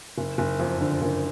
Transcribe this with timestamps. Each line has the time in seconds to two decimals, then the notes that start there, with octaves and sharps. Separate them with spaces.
0.18 F#1
0.38 F#1
0.60 F2
0.81 D3
1.02 F#1